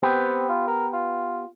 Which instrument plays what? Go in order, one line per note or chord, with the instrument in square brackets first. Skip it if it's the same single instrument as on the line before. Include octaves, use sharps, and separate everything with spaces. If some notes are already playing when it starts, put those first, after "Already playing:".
[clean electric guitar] B3 G4 B4 [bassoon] C4
[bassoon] F4
A#4
F4